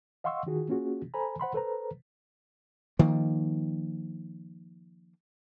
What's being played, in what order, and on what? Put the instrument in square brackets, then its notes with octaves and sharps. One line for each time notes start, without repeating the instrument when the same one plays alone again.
[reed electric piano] D#5 F5 F#5 C6 C#6 E6
D#3 F4 F#4 G#4
A#3 C#4 F4 F#4 G#4
A4 C5 G#5 A#5 B5
C5 F#5 B5 C6
A4 B4 C5 A#5
[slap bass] D#3 F3 A#3